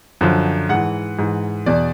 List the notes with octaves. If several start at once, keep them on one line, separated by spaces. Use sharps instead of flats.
F#2 D3 F3
G#2 E3 F#5
G#2 E3
E2 B2 D5